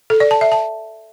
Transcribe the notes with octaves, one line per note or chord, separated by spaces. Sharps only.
A4
D5
A5
E5
A5